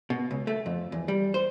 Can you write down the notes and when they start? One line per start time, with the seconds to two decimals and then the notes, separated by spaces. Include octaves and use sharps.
0.10 B2
0.31 C#2
0.47 A3
0.66 F2
0.92 E2
1.08 G3
1.34 C5